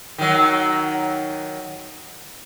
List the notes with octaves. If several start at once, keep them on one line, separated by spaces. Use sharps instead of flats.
D#3 F#3